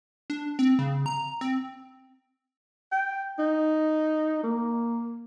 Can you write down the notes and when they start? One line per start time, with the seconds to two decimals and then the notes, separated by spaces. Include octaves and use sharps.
0.30 D4
0.59 C4
0.79 C#3
1.06 A#5
1.41 C4
2.92 G5
3.39 D#4
4.44 A#3